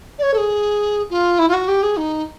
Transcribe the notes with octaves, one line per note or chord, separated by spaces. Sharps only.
D5
C#5
A4
G#4
F4
E4
F4
F#4
G4
G#4
D#4